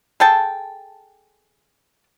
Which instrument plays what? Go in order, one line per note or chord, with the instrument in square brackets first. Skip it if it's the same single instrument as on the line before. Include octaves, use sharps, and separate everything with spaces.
[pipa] G#4 A4 G5 A5